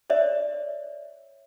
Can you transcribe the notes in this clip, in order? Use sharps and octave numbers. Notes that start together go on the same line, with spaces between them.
C#5 D5 E5